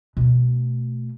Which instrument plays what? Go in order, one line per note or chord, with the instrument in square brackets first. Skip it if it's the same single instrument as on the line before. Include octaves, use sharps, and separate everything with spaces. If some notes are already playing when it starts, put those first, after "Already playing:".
[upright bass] B2 A3